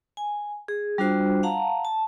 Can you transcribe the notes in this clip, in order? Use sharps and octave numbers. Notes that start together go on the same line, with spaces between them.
G#5
G#4
G3 D4 F4 F#4 C5
F5 F#5 A5 A#5
A5